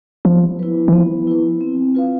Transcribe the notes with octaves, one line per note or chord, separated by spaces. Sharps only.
F3 B3
E4 B4
E3
F3 B3
E4 B4
C4
F4 B4 F5